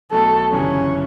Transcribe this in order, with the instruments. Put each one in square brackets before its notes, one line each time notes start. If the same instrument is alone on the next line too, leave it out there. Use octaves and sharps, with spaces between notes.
[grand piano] B1 B2 A3 [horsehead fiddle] A4
[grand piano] G1 F#2 C#3 E3 G3 [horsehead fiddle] C#4